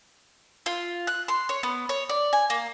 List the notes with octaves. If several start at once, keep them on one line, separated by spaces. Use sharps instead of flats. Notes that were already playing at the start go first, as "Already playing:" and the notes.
F4
F#6
C6
C#5
B3
C#5
D5
G#5
A#3